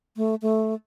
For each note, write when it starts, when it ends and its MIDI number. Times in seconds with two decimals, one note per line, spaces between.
0.17 0.35 57
0.42 0.74 57